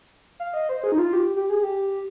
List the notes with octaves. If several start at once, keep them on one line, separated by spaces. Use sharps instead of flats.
F5
D#5
C5
G#4
D#4
F4
G4
G4
G#4
G4